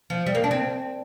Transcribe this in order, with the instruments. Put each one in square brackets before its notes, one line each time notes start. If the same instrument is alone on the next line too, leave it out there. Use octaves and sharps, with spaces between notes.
[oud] F3
G3
A#3
D4
C4